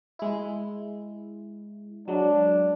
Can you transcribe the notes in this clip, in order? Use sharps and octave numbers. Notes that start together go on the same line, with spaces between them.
G#3 E4
F#3 G#3 D4